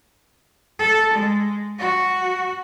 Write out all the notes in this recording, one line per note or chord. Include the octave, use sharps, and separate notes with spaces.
A4
G#3
F#4